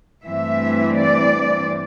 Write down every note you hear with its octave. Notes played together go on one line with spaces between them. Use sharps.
G2 E3 A3 C4 E5
D5